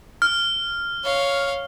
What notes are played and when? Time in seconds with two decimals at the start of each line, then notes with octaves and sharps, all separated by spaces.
0.22 F6
1.04 C#5 F5